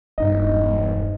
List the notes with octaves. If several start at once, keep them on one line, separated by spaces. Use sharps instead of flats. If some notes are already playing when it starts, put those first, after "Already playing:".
E1 G2 D#4 D#5